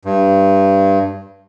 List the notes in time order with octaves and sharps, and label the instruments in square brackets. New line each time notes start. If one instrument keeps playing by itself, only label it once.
[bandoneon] G2